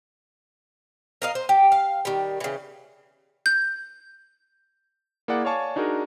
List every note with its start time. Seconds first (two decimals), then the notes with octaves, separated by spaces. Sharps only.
1.22 A#4 D#5 F5
1.35 C5
1.49 G4
1.72 F5
2.05 D#3 G3
2.40 C#3 E3
3.46 G6
5.28 A#3 E4 G#4 D5 F#5
5.45 C#5 D5 F5 G#5 A5 C#6
5.76 D4 D#4 F#4 G#4 A#4